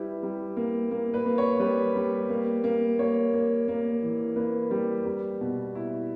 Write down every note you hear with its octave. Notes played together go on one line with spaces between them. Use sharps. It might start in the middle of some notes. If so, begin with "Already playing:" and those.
Already playing: G3 E4 B4
G3
A#3
A#3
B4
A#3
C#5
G3 B4
G3
A#3
A#3
A#3 C#5
A#3
A#3
E3
A#3 B4
G3
G3
B2
E4